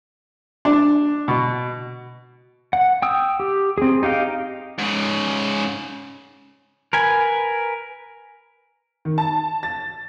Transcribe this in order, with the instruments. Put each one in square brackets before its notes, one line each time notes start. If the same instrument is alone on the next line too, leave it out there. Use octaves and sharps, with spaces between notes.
[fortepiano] D4
B2
[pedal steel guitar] F#5
G5 D#6 E6
G4
C4 G#4
D#4 G4 F5 G5
[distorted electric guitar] G#2 C#3
[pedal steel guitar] A#4 B4 G#5
[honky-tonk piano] D#3
A5
A6